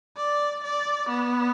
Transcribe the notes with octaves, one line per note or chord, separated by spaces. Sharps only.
D5
D5
B3